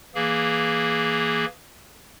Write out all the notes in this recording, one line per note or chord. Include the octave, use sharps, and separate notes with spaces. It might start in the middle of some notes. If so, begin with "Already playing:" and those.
E3 A#3 G#4